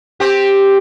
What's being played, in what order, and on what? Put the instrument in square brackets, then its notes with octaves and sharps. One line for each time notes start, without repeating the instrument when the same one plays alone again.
[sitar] C4 G4